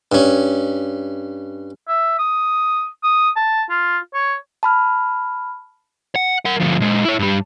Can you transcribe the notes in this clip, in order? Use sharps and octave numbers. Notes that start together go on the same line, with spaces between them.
G2 C#4
E5
D#6
D#6
A5
F4
C#5
A5 B5 F6
F#5
A#4 F#5
D2 F3
A#2 G#3
E4 C#5
G2 G3